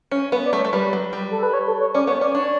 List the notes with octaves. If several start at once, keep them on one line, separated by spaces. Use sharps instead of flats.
C#4
B3 B4
D5
A3
C#5
A3
G3 B4
F#3
G3
A4
B4
C#5
A4
C#5
C#4 D5
B3 C#5
C#4 D5
D4 C#5